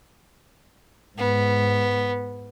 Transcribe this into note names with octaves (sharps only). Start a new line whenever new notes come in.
G#2 B3